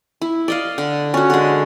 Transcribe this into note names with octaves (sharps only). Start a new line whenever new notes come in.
E4
D5 D#5 F5
D3
C#4 F#4
D3 G#3